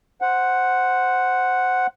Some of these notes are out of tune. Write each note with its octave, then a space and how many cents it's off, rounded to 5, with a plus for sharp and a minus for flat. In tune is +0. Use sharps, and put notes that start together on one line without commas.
C5 +0 F#5 +0